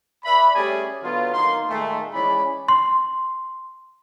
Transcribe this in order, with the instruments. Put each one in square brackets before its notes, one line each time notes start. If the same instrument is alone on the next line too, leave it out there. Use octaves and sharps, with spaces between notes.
[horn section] B4 D5 E5 B5
G3 A3 C#4 G#4 D5 G#5
D3 F#3 B3 F4
D#3 A#3 D#4 C6
A#2 D#3 G#3 A3
E3 G#3 C#4 D5 B5
[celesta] C6